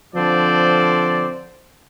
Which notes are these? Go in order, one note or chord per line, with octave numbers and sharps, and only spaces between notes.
D3 F3 C4 C5 D5